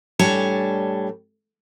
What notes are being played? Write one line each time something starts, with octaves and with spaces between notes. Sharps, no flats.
A2 G3 D4 C#5 G#5 A5